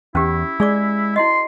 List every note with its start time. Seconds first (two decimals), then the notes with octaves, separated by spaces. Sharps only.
0.15 E2 C#4 E4 G4
0.60 G#3 G#4 D5 D6
1.16 E4 F#4 D#5 C6